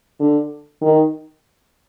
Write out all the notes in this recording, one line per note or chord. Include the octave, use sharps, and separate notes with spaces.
D3
D#3